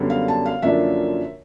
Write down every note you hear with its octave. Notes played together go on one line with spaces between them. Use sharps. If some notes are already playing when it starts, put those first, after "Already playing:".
Already playing: F#2 D3 G3 B3
F5
A5
F5
F#2 D3 F3 A#3 D4 E5